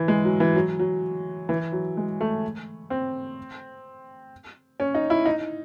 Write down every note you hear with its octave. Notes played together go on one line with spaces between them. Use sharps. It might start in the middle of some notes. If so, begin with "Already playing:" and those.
Already playing: E3
G#3
F#3
E3
F#3
F#3
E3
F#3
G#3
A3
C4
C#4
D#4
E4
D#4